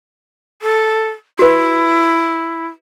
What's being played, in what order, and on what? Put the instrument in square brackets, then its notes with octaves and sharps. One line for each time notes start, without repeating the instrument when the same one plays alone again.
[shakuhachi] A4
[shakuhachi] E4 [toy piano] F#4 B4